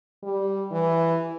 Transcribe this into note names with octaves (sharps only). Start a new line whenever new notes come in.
G3
E3